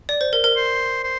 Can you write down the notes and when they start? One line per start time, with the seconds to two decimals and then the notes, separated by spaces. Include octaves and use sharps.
0.09 D5
0.21 C5
0.33 A#4
0.44 A#4
0.56 C5
1.03 C5